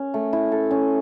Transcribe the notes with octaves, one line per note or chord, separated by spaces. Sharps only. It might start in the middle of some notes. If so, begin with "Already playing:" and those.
Already playing: C#4
A3
E4
A4
C#4